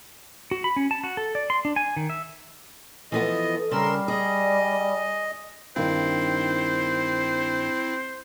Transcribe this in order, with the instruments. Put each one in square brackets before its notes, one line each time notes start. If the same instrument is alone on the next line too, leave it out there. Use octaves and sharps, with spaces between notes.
[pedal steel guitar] F#4
B5
C#4
A5
F#4
A4
D5
C6
D4
G#5
D#3
E5
[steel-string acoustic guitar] E3 F3 B3 [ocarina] A4 [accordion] D#5
[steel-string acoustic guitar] C#3 [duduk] G3 [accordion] A#4 C6 E6
[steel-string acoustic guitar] G#4 [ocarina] D5 [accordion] D#5
[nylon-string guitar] G2 D#3 [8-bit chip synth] C4 E4 [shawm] C5